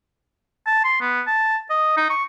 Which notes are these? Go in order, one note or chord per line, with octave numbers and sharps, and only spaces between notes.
A5
C6
B3
A5
D#5
D#4
C#6